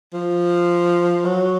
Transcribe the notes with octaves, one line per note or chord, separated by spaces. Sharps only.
F3
F#3